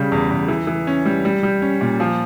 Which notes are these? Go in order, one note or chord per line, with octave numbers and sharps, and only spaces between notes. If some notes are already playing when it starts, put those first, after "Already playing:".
Already playing: C#3 G3
E2
E2
E3
E3
C#4
G3
G3
G3
C#4
A#2
F3